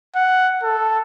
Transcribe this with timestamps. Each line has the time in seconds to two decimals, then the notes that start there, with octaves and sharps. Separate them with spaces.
0.15 F#5
0.63 A4